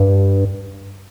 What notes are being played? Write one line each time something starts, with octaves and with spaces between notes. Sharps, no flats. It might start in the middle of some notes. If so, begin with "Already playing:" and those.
Already playing: G2